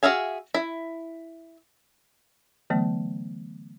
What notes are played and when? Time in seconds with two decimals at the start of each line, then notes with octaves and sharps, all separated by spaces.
0.03 F#4 G#4 E5 F5 G#5
0.54 E4
2.70 D3 E3 F#3 A3 B3